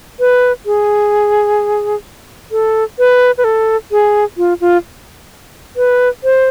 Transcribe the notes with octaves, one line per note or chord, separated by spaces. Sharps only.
B4
G#4
A4
B4
B4
A4
G#4
F4
F4
B4
C5